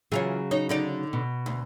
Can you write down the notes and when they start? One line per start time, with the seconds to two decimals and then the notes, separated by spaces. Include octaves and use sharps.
0.12 C#3 E3 F#3 F4 G#4 C#5
0.51 D#4 C#5
0.69 D3 D#4 D5
1.13 B2
1.46 D2